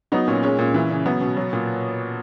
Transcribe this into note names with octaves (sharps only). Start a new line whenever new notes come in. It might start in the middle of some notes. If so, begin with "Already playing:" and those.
F#3 B3 D#4
A#2 C#4
G#3 C#4
A#2
E3
C#3
F#3 B3
B2
F#3
A#2